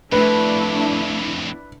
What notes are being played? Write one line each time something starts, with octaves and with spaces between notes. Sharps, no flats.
F2 A2 A3 D4 E4 B4